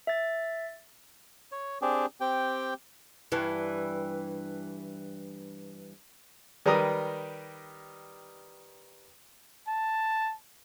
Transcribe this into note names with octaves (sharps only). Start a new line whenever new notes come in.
E5 A6
C#5
C4 D4 G4 G#4
C4 G4 G5
G2 E3
D#3 G3 B4 A#5 D#6
A5